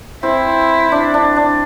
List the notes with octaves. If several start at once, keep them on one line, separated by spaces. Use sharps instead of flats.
C4 E4
D4
D4
D4